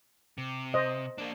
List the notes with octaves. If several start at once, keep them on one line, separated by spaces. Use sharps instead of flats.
C3
C5 D#5
A#3 D4